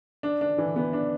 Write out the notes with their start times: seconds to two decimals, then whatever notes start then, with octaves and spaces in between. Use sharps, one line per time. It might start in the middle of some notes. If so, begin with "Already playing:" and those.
0.23 D4
0.41 D4
0.58 E3
0.76 B3
0.93 D4